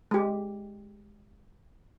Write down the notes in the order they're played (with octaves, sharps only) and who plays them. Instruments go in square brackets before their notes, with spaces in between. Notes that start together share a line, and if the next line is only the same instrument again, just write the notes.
[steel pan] G#3 G4